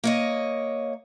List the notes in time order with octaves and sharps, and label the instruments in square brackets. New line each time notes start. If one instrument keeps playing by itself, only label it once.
[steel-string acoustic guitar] A#3 C#5 D#5